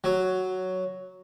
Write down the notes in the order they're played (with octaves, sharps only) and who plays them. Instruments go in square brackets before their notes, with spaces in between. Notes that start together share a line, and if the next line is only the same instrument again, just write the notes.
[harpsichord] F#3